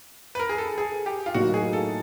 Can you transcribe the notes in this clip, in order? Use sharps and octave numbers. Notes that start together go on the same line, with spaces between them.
B4
A#4
G#4
A4
G#4
G4
F4
A2 F#3 A#3 D#4 F#4
G#4
A4